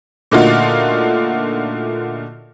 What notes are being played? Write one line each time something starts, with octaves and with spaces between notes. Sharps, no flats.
A#2 D3 A3 D#4 F4 F#4